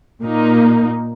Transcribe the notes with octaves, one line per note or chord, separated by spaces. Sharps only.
A#2 A#3 D#4